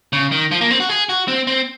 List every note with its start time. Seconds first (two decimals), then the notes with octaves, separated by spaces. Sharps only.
0.13 C#3
0.31 D#3
0.51 F3
0.61 A#3
0.71 C4
0.80 F#4
0.89 G#4
1.09 F#4
1.28 C4
1.47 C4